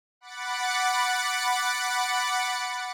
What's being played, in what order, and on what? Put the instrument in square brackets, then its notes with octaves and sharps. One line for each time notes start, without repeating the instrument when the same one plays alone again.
[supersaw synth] F#5 B5 D6 F#6 A6 C#7